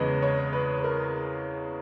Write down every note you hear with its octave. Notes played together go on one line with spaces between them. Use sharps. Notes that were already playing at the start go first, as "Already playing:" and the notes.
Already playing: E2 C#3 G#3 B3 B4 C#5 D#5
C#5
B4
B4
A#4